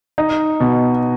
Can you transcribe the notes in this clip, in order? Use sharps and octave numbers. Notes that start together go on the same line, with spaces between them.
D#4
B2